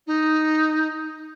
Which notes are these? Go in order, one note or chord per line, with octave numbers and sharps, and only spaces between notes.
D#4